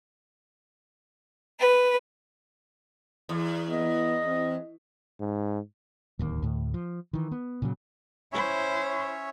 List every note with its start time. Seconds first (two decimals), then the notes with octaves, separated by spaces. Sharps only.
1.60 B4
3.29 E2
3.69 B3 D#5
4.26 C4
5.20 G#2
6.19 D1 D#2 A#3
6.42 D2 A2
6.74 F3
7.13 D#3 E3
7.32 B3
7.62 A#2 C#3 F#3
8.33 C#4 E4 C5 C#5 E5